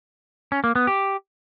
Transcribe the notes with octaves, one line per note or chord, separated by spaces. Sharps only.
C#4
A#3
B3
G4